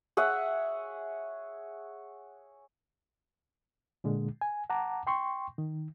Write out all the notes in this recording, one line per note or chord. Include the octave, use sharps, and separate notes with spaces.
G#4 C#5 E5 F#5
A#2 D3 G#3
G#5
F#5 A5 A#5 D6
G5 C6 C#6
D#3